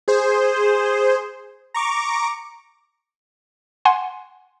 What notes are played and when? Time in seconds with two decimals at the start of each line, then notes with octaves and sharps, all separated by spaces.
0.08 G#4 C5
1.74 A#5 C#6 D6
3.85 F#5 G#5 C6